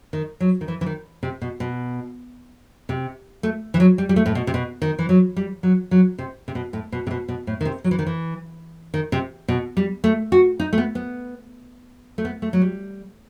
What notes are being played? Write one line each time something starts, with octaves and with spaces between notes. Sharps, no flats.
D#3
F#3
D#3
E3
E3
D#3
C3
B2
B2
C3
A3
E3
F#3
G3
G3
A3
A2
B2
C3
B2
D#3
E3
F#3
G3
F#3
F#3
C3
C3
B2
A2
B2
C3
B2
B2
A2
D#3
C3
F#3
E3
D#3
E3
D#3
C3
B2
G3
A3
F#4
D#4
A3
B3
B3
A3
B3
A3
F#3
G3